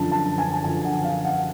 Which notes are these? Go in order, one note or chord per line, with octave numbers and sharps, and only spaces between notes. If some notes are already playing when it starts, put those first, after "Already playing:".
Already playing: F#2 D3 F3 A5
A5
G#5
F#2 D3 F3 G#5
F#5
F5
F#5